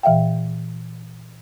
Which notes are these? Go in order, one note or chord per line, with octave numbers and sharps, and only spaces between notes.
A#2 E3 E5 F5 G5